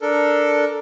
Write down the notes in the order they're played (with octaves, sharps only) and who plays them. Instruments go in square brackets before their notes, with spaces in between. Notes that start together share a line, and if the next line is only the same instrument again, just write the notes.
[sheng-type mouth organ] D4 A4 A#4